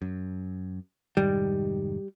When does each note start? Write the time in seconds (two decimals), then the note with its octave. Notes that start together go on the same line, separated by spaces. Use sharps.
0.02 F#2
1.17 F1 G#2 D#3 G3